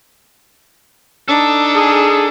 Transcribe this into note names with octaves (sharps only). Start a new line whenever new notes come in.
D4 D#4 A4
G#4